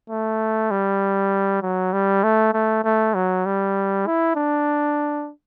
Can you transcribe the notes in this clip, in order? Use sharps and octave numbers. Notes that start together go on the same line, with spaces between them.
A3
G3
F#3
G3
A3
A3
A3
F#3
G3
E4
D4